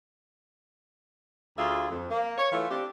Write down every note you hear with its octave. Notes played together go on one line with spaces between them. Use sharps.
D2 F4 G#4 E5
F2
A#3
C#5
E3 A3 F4
C4 D4 G4